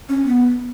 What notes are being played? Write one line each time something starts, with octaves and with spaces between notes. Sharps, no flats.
C#4
B3